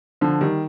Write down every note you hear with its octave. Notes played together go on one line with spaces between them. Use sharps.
D3 F3
D#3 G3